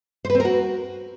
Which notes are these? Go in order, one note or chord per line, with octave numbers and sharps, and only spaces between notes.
C5
B4
C4
A#4
F#4